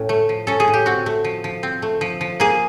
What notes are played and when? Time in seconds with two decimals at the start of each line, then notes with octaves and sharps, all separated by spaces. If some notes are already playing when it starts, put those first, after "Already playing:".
Already playing: A2 C#4
0.09 A3
0.29 F3
0.47 C#4 A4
0.60 G#4
0.68 A2
0.74 G4
0.86 C4 F#4
1.06 A3
1.24 F3
1.44 F3
1.63 C4
1.82 A3
2.01 F3
2.21 F3
2.40 A#3 G#4